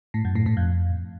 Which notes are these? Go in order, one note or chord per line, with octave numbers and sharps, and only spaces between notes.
A2
F#2
A2
A2
F2